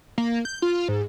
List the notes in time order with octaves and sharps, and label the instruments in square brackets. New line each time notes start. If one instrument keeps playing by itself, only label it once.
[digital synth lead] A#3
G6
F4
G#2